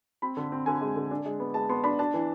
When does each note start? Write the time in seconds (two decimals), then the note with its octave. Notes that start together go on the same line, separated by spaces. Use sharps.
0.22 C4 B5
0.37 D3
0.52 C4
0.66 D3 G#5
0.81 G#3
0.96 D3
1.11 D4
1.25 G#3
1.40 B3
1.54 G#3 A5
1.69 B3 C6
1.84 D4 B5
1.99 D4 A5
2.14 E3